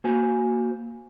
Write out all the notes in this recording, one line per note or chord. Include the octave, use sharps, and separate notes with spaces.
A#3 F#4 C5 G#5